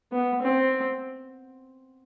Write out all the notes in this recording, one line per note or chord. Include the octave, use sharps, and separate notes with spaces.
B3
C4